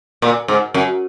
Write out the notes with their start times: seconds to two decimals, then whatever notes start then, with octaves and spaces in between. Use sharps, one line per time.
0.22 A#2
0.48 G#2
0.74 F#2